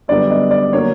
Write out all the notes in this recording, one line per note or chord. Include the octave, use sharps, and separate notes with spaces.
F#2 D3 G3 B3 D5
D#5
D5
D3 F#3 A#3 C#5